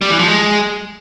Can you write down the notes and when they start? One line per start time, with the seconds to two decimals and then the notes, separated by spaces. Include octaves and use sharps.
0.01 G3
0.10 E3
0.19 F3
0.28 G#3